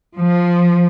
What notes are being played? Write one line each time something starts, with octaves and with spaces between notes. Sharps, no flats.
F3